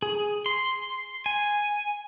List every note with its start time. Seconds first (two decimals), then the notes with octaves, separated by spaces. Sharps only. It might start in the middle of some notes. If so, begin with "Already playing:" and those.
0.02 G#4
0.46 C6
1.26 G#5